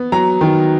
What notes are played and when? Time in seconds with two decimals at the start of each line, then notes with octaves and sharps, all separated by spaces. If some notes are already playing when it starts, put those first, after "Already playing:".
Already playing: B3
0.12 F#3 A#5
0.41 D#3